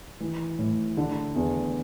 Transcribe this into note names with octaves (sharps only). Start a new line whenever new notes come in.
E3
A2
D3
E2